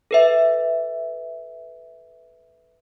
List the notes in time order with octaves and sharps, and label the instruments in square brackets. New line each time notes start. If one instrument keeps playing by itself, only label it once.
[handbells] A4 B4 E5